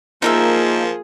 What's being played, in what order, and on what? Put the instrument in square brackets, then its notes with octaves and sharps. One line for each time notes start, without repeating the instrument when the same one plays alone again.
[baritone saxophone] F3 [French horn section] A#3 [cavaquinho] D#4 A#4 E5 [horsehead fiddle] F4 G#4